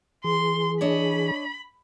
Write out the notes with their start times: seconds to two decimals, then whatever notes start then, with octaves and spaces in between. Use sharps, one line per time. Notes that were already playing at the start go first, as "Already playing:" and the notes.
0.24 E3 G#4 C6
0.81 D4 C#5 D#5 B5